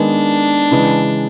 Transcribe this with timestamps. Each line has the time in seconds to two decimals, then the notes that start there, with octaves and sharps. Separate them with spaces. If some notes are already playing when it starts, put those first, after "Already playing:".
Already playing: D#3 G#3 B3 D4
0.71 C#3 E3 G#3